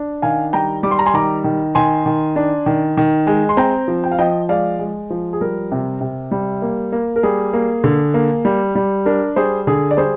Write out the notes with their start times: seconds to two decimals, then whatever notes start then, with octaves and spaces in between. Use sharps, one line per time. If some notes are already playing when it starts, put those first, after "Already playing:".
Already playing: D4
0.22 D#3 F5 G#5
0.53 G3 G5 A#5
0.83 G3 D6
0.91 C6
0.99 A#5
1.06 G#5 C6
1.14 D#3 A#5 D6
1.44 D#3
1.75 D#3 G#5 C6
2.06 D#3
2.36 D4
2.66 D#3
2.97 D#3
3.27 G#3
3.49 C6
3.57 C4 G5 A#5
3.88 F3
4.04 G5
4.11 F5
4.18 F3 D#5 G5
4.49 G#3 D5 F5
4.79 G#3
5.10 F3
5.33 G#4
5.41 G3 A#4
5.72 C3
6.01 C3
6.31 G3
6.62 A#3
6.92 A#3
7.16 A#4
7.23 G3 G#4
7.53 A#3
7.84 D3
8.14 A#3
8.45 G3
8.75 G3
9.06 D4 A#4
9.36 G3 G#4 C5
9.67 D3 G#4
9.91 D5
9.97 G3 G#4 C5